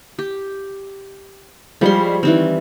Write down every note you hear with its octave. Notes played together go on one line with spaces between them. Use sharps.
G4
F3 G3 G#3 C#5 C6
D#3 E3 G3 C4